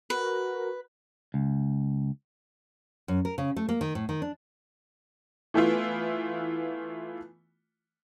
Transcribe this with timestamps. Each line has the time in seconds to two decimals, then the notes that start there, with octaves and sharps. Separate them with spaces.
0.10 F#4 A#4 B4
1.34 C#2
3.08 F#2
3.25 A#4
3.38 C#3
3.56 A3
3.69 A#3
3.81 D#3
3.95 A2
4.09 D#3
4.22 D4
5.54 E3 A3 B3 E4 F4